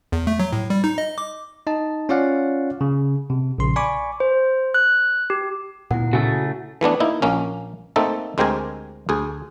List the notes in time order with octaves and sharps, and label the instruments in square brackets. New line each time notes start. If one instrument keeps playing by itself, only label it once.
[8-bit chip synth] E2
A3
F#3
A2
G3
D#4
D#5
D6
[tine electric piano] D#4 D#5 A5
C#4 F4 C#5 D5 F5 F#5
C#3
C3
A#1 C#3 C6
D5 G#5 B5 C#6 D6
[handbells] C5
F#6
G4
[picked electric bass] D2 A#2 B3 [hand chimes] E4 F#5
[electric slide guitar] C#3 A3 [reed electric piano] F#4
[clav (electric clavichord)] E3 A3 B3 D4
A#3 D#4 E4
A#1 A#3 C#4
A3 A#3 C4 D#4 A4
D2 G#3 C4 G4 A#4 G#5
D2 G#4